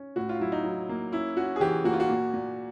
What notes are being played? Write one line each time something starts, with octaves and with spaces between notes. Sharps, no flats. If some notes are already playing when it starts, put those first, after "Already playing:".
Already playing: C#4
A2 F#4
F4
F#3 E4
D#4
F#3
A#3
C#4 E4
C#4 F#4
G#4
E3 G4
A#3 F#4
F4
F#4
A#2
A#2